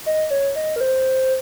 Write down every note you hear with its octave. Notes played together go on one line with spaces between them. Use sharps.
D#5
C#5
D#5
A#4
C5